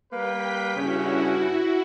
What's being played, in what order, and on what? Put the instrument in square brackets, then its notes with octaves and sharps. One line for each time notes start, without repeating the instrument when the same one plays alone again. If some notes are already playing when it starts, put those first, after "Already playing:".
[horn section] G3 A#3 B4 [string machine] G5 B6
[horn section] G2 C#3 C#4 [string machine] E4 F#4